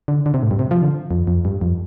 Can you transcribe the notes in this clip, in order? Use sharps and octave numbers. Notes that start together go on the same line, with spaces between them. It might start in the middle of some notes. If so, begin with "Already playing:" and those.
D3
D3
C3
A2
G2
C3
F3
D3
F2
F2
G2
F2